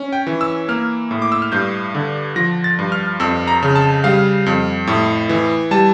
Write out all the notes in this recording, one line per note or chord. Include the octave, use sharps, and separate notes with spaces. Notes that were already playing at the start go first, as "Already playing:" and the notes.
Already playing: C#4
G5
E3
E6
A#3 F6
A2
D6
E6
F6
G2 G6
D3
F3 A#6
A6
G2
F6
F2 E6
A#5
C#3
A5
G3 F5
F2
A2
E3
G3 A5